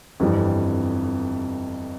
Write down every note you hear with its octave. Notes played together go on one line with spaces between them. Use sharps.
G1 F2 E3 G3